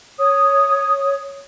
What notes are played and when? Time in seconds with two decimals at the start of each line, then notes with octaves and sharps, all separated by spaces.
0.19 C#5 D#6